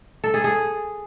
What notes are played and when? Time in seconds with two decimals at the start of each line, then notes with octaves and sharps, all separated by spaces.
0.24 A4
0.34 G#4
0.44 G#4